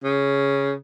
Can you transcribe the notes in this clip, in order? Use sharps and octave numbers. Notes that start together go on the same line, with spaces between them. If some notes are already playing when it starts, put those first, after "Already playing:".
C#3